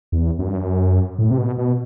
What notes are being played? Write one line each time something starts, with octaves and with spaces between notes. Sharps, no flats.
E2
F#2
G2
F#2
A2
C3
B2
B2